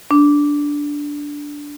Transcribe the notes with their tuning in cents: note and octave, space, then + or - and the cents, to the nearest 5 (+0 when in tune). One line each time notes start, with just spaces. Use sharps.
D4 -10